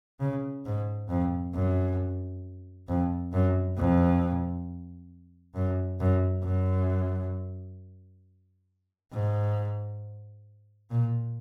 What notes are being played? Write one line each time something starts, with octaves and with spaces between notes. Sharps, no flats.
C#3
G#2
F2
F#2
F2
F#2
F2
F#2
F#2
F#2
G#2
A#2